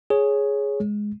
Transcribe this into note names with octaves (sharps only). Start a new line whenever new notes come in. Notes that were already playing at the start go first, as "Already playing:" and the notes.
G#4 C#5
G#3